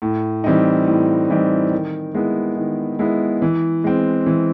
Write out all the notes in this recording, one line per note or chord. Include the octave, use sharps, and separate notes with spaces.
A2
E3 G3 C4 D#4
A2
E3 G3 C4 D#4
D#3
G#3 B3 E4
D#3
G#3 B3 E4
E3
G#3 C4
E3